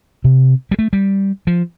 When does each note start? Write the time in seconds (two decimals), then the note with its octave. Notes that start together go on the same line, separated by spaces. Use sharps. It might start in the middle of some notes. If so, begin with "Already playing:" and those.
0.24 C3
0.71 G3
0.79 A3
0.93 G3
1.47 F3